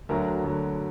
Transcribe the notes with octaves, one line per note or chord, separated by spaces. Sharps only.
D2 D3 F#3 A#4
D2 D3 F#3